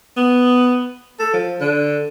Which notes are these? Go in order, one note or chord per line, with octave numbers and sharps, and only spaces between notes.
B3
A4
F3
D3